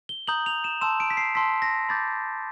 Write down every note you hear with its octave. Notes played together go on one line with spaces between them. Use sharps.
G7
A#5 D#6 G6 F#7
F7
E7
A5 C6 E6 E7
D7
B6
C7
A5 C6 E6 B6
A#6
B5 D6 G6 A6